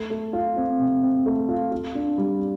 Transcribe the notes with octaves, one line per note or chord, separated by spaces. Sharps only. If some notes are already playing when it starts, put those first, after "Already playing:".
Already playing: A3
A3
F4
C4
C3
C4
A3
F4
F4
D4
G3